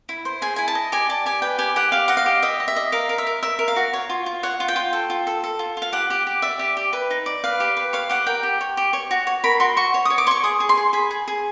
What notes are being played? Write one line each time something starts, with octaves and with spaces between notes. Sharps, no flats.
E4
C5
G#4 G#5
E4 G#5
A5
D#5
G4 G#5
D5 A5
G4 G#5
B4 G5
G4 G#5
G4 F#5
G4 F5
D#5 F#5
F5
G4
D#5 E5
D#5
E5
D#5
A#4 F5
A#4
E5
A#4
A#4 E5
A#4
F5
F#4
C#5
F4
F4
C#5 F#5
F4
G5
F4
A4
F4
A4
A4
F4
F4
F5
G4 F#5
G4
G4
D5 E5
G4
G4
B4
D#4
D5
B4 F5
G4
B4
C#5 F5
G4 F#5
A#4 G5
G4
C#5
G4
C#5
F#4
C#5
A#4 B5
F#4 C6
F#4 C#6
C#5
C#5 D#6
D6
C#5 C6 C#6
G#4 D#6
G#4
C6
G#4
G#4 B5
G#4
G#4